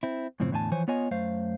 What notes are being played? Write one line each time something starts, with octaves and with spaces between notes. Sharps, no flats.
C4 E4
F#2 A2 C#3 F3 C4
E2 A2 D3 E5 G#5 A5
E3 F3 C5 C#5 G#5
B3 F4 C#5 D#5 G#5
F#2 A3 C5 F5